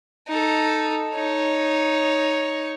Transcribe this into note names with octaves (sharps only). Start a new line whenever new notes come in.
D#4 A4
D#4 C#5